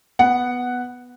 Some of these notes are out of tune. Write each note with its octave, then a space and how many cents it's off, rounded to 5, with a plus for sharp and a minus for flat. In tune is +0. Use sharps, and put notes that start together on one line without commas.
B3 +0 F#5 +0